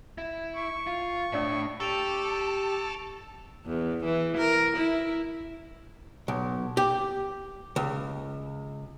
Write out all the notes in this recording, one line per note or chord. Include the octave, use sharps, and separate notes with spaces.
E4
C#6
F4
A2 D4 D5 E5
G4 A4 A5 C#6 E6 D7 F7
E2
E3
A#4
E4
B1
G4
C#2